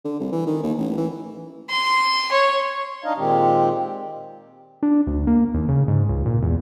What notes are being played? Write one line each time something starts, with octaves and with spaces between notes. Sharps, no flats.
D3
C2
E3
D#3
D#2
A1
E3
C6
C#5
D4 D#4 D#5 F5
A#2 D#3 G#3 C4 G4
D4
D2
A#3
D#2
C#3
G#2
C#2
A#2
E2